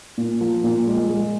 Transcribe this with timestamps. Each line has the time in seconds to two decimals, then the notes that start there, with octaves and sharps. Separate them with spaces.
0.18 A#2
0.41 F3
0.64 A#2
0.87 G#3
1.10 G#3